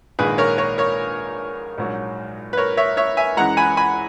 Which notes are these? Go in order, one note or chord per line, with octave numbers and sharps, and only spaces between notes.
A#1 G#2 D#3 A#3 G#4 B4
A#4 C#5
A#4 C#5
A#4 C#5
A#1 G#2 F#3
B4
A#4 C#5
C#5 E5
C#5 E5
E5 G#5
F#2 E3 G#3 F#5 A#5
G#5 B5
G#5 B5